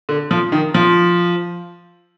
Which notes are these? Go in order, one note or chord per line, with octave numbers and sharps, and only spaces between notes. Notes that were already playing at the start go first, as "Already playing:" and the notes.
D3
F3
D#3
F3